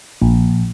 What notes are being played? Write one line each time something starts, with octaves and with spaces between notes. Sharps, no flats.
A#1